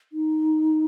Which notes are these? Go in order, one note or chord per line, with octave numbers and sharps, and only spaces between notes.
D#4